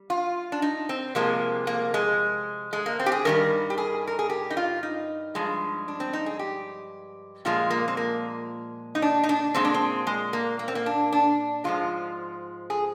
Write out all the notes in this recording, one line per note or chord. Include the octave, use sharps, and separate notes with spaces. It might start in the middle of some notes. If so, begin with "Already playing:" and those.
Already playing: G3
F4
D4
D#4
C4
C3 F3 G#3 A#3
A#3
G#3
G#3
A#3
C4
G4
G#4
G2 D#3 G3 A#4
G4
G#4
A#4
G#4
G4
D#4
F4
D#4
G2 F3 G#3
D4
C4
D#4
G#4
G4
A#2 F3 G#3 F4
A#3
C4
A#3
D#4
D4
D#4
D4
A#2 G#3 C4
D4
C4
G#3
A#3
A#3
C4
A#3
D4
D4
G#2 F3 G#3 F4
G#4